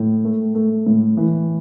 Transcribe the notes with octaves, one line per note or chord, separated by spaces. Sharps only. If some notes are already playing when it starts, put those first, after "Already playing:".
Already playing: A2
A3
A3
A2
E3